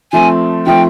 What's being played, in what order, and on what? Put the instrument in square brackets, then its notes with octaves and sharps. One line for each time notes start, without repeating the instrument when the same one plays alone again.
[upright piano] F3 A3 C4 [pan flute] G#5
[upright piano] F3 A3 C4 [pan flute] G5